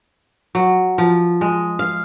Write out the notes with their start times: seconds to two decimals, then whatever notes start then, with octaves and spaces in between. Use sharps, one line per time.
0.55 F#3
0.98 F3
1.41 G#3
1.79 F5